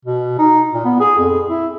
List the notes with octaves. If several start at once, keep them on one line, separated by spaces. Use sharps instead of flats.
B2
D#4
A#2
B3
G#4
F2
E4